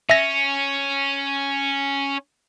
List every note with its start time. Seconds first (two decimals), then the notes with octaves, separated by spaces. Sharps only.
0.10 C#4 E5 A#6